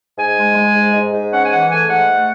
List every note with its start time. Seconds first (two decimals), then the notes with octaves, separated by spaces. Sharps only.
0.17 G#2 G#5
0.37 G#3
0.55 G#3
0.75 G#2
0.94 G#2
1.13 G#2
1.31 C#4 F#5
1.43 G#5
1.50 E3 F#5
1.70 A3 G#5
1.88 G#2 F#5
2.09 A3